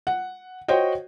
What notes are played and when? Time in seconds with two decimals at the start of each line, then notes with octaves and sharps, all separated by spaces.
0.07 F#5
0.68 F#4 C5 C#5 D#5 G5